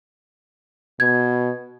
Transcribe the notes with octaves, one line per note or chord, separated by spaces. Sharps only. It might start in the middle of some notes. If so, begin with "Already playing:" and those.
B2 G#6